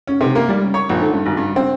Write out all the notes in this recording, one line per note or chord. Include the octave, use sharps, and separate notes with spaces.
C#4
C3
A#3
G3
C#4
C#5
A#1
D3
G2
G#1
G2
C4